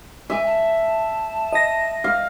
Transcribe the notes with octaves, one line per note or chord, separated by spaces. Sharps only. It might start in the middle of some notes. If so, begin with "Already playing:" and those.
E5 G#5
A5
D#5 A#6
F5